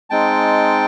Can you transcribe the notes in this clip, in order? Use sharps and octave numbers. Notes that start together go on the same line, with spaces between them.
G#3 C4 D#4 G5 A5